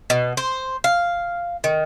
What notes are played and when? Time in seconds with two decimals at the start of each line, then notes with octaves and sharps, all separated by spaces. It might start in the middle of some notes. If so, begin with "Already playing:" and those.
0.10 B2
0.37 C5
0.84 F5
1.64 D#3